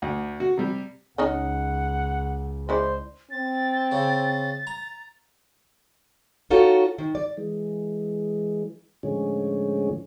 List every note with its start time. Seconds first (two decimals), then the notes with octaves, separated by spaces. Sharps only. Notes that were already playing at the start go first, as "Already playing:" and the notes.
0.02 D2
0.40 F#4
0.57 C3 G3
1.18 C#2 C#4 D#4 D#5 F#5
2.69 G#3 E4 C5 D5
3.31 C4 A6
3.92 C#3
4.67 A#5
6.50 D#4 F4 F#4 A4 C#5
6.98 D#3
7.15 D5
7.37 E3 G#3
9.03 A2 D3 F3 G#3 C#4